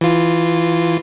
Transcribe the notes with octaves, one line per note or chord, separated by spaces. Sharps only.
E3 F4